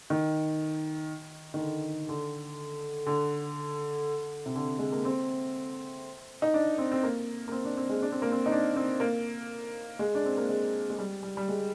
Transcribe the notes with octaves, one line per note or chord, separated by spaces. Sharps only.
D#3
D#3
D3
D3
D3
C3
D3
G#3
A#3
C4
D#4
D4
C4
C4
A#3
A#3
C4
D4
C4
G#3
D4
C4
A#3
C4
D#4
D4
C4
A#3
G#3
D4
C4
A#3
G#3
G#3
G3
G3
G3
G#3